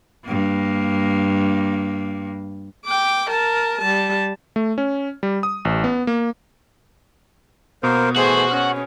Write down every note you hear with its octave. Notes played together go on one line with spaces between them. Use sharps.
G2 A#3
G5 D6
A#4 A5
G3 A5
A3
C#4
G3
D#6
A1
B3
A#3
B2 A#3 B3 A#4 C5
E3 A3 F#4 G#4 C5
C#4 F#5